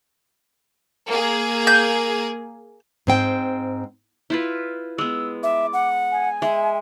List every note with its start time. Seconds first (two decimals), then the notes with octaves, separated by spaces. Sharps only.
1.08 A#3 G#4
1.67 G6
3.07 G#2 C4 G5
4.30 E4 F4 B4
4.98 G#3 B3 E6
5.43 E5 D6
5.73 F#5
6.12 G#5
6.42 G#3 E5